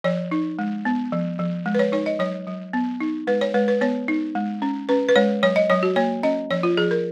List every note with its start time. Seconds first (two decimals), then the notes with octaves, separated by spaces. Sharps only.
0.04 F3 C#5
0.31 D#4
0.59 G#3
0.85 B3
1.12 F3
1.39 F3
1.66 G#3
1.75 B4
1.79 C#5
1.92 D#4 C#5
2.06 D#5
2.19 F#3 C#5
2.47 F#3
2.73 B3
3.00 D#4
3.27 G#3 B4
3.41 C#5
3.54 G#3 B4
3.68 B4
3.81 B3 C#5
4.08 D#4
4.35 G#3
4.62 C#4
4.89 C#4 B4
5.09 B4
5.16 G#3 C#5
5.43 F#3 C#5
5.56 D#5
5.70 F#3 C#5
5.83 F#4
5.96 A#3 C#5
6.23 C#4 D#5
6.51 F3 C#5
6.63 F4
6.77 F3 G#4
6.91 A#4